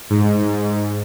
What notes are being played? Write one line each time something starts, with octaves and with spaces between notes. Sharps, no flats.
G#2